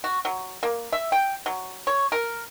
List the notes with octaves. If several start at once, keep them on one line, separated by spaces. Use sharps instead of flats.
F#4
F#3
A#3
E5
G5
F#3
C#5
A#4